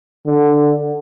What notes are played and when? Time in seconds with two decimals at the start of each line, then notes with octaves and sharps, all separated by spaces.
0.26 D3